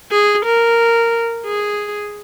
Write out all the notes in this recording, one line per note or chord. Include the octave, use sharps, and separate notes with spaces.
G#4
A#4
G#4